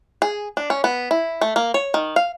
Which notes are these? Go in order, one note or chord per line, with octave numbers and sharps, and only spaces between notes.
G#4
D4
C#4
B3
E4
A3
A#3
C#5
D#3
F5